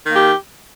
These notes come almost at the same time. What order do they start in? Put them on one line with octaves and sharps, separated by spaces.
D#3 A#3 G4